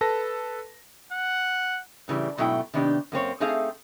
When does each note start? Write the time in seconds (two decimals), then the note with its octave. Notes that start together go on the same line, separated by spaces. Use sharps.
0.01 A4 B4 A5 A#6
1.12 F#5
2.08 A2 C#3 E3 G3
2.37 G#2 B2 F#3 A3 E4 G5
2.74 C3 D#3 B3 D4 D#4 G4
3.12 F#2 A#3 C4 C#5
3.40 A3 C4 D#4 G#4 E5 F5